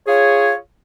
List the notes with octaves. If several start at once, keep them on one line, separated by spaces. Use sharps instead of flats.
F4 G#4 C#5